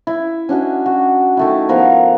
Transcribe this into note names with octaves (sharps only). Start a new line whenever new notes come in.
E4
C#4 D4 F#4 D#5
F#4
D#3 A3 E4
F3 B3 A#4 F5